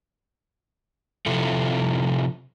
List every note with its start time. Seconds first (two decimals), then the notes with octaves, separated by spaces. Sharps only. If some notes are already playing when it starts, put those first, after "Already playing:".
1.26 C3 F3 E4 A4